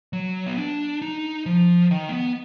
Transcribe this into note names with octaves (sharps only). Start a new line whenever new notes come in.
F#3
B3
D4
D#4
F3
D#3
A#3
B3